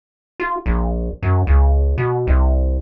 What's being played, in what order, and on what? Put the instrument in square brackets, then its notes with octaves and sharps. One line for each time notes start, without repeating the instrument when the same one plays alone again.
[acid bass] F4
A#1
F#2
C#2
B2
C2